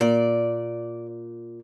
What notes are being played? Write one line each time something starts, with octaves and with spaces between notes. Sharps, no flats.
A#2 D5